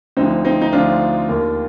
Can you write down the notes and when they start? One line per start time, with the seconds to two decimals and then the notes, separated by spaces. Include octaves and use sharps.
0.17 D2 D3 F3 C4 D#4
0.45 C4 D#4
0.62 D#4
0.72 D2 D3 F3 D4 F4
1.29 D#2 D#3